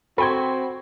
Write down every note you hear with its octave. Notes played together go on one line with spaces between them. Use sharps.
C4 F#4 A4 G5 B5 C6 G#6